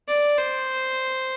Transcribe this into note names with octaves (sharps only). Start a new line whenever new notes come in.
D5
C5